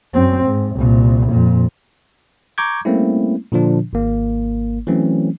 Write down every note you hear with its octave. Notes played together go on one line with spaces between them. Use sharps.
F#2 C4
G#2
C2 A#2
F2 A#2
A#5 C#6 D6 G6 G#6
G3 A3 A#3 C4 C#4 E4
A#2 D3 F3 D4
G#1 A#3
E3 F#3 A3 C4 C#4